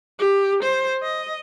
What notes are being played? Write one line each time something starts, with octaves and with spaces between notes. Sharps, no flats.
G4
C5
D#5